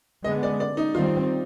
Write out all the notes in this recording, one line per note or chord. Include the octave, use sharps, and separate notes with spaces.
D3 G#3 B3 D#5
D5
D5
D#4
D#3 G3 C4 F4